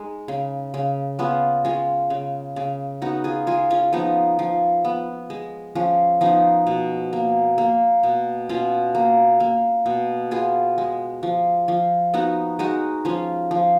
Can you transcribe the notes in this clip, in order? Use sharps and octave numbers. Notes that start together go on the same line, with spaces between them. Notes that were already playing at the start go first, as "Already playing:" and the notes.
Already playing: G#3 D#4
C#3
C#3
B3 C#4 F4
G#3 C#4 F4
C#3
C#3
B3 D#4 F#4
F4 G#4
G#3 F4 G#4
C#4 F4
F3 B3 D#4
F3
B3
G#3
F3 C#4
F3 B3 D#4
B2
A#3
A#3
B2
B2 C#4 F4
A#3
A#3
B2
B3 F4 G#4
G#3
F3
F3
B3 D#4 F#4
G#3 D#4 F#4
F3 C#4 F4
F3